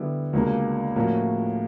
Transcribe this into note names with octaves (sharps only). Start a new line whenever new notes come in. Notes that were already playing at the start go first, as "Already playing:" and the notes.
Already playing: D3 G3 B3 E4
C#2 B2 G3 A#3 D4
A2 F3 A#3 C#4 F#4